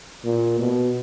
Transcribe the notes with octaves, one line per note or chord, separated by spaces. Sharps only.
A#2
B2